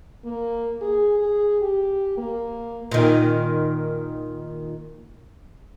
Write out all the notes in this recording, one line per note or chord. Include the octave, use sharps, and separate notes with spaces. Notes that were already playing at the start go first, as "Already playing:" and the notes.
A#3
G#4
G#4
G4
A#3
A#2 D#3